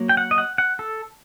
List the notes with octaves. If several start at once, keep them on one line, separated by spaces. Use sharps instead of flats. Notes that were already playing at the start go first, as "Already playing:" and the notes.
Already playing: F#3 A#3
G5
F#5
D#5
F#5
F#5
A4